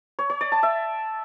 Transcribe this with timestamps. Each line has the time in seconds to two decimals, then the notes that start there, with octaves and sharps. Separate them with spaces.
0.19 C#5
0.30 C#5
0.41 D5
0.52 A5
0.63 E5